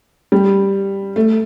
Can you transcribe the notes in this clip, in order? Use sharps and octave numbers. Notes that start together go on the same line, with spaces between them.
G3
A3